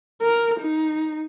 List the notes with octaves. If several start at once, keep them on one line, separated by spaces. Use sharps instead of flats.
A#4
D#4